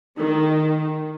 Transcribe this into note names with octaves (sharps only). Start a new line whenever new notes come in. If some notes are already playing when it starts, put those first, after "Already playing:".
D#3